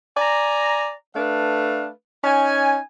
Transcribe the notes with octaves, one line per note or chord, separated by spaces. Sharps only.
D5 G#5 A#5
A3 D4 B4 F5
C#4 D#4 G#5